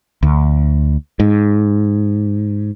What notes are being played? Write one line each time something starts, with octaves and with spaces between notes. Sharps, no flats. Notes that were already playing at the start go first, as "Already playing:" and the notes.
D2
G#2